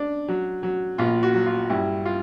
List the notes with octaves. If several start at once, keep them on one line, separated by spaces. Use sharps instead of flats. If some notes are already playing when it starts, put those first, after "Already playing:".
Already playing: D4
F#3
F#3
A#1 F4
F#4
F#3
F4
G2 E4
F4